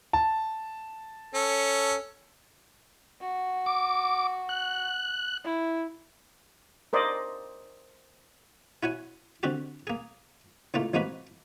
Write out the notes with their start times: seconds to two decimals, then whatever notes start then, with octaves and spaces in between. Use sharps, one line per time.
0.13 A5
1.34 C#4 A4
3.21 F#4
3.66 D6
4.49 F#6
5.44 E4
6.93 A#4 C5 D5 D#5
8.83 E4 F#4 C#5 G#5
9.43 D3 C4 F#4 G4
9.87 A#3 G#4
10.74 C#2 A2 A3 A#3 F4
10.94 A1 C3 G#3 A#3 F#4 B4